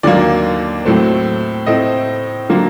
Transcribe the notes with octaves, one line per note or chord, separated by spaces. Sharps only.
D#2 D3 F#3 A#3 D5
A2 F#3 A3 C4
A2 A3 C4 D#5
D3 F#3 A#3